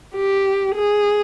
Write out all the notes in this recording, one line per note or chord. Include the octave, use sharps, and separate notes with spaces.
G4
G#4